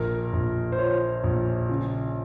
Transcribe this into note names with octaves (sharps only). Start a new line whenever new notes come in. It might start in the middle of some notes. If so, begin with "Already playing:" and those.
Already playing: A#1 A#4
A#1
C5
F3 C#5
A#1
C#3